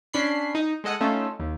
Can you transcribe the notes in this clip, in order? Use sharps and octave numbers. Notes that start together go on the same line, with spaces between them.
C#4 D4 B5 C7
D#4
G#3 A4 D#5 F#5
A3 C#4 D#4 F4 A4
D#2